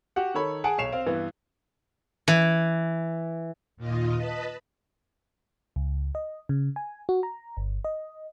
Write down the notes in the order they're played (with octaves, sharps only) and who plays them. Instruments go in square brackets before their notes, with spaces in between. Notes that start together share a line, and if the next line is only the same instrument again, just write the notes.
[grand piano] F#4 G4 F#5
D#3 A4 C#5 B5
G#4 F#5 G#5 A5 D7
B1 C#5 C7 E7 F7
C4 F5
G2 E3 B3
[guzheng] E3
[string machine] D#2 A#2 F4 D#5
B4 D#5 A5 B5
[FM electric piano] C#2
D#5
C#3
G#5
F#4
A#5
G1
D#5